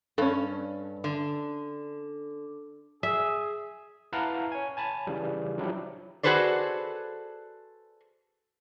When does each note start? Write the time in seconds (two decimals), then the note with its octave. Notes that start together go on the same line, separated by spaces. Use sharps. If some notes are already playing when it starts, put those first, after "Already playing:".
0.18 G2 C#4 A4
1.04 D3
3.03 G#4 E5
4.13 E4 B4 F5 F#5 A5 A#5
4.52 C#5 G#5
4.77 G#5 A5 B5
5.07 C#3 E3 G3
5.58 F3 F#3 D4 E4 G4
6.23 F#4 G#4 A4 B4 C5 D5